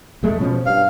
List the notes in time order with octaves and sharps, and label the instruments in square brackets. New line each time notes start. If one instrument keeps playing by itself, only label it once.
[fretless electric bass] F2 G#3 A3
B2 F3 C#4
[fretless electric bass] G2 [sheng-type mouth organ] F5